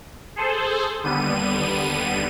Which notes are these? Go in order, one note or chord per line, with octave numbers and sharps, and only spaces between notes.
G#4 A4 C5
D#2 D3 G3 B3 D#7